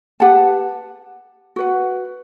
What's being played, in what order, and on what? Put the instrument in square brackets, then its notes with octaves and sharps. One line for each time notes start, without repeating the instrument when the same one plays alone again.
[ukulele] G4 B4 F#5 A5
F#4 B4 F#5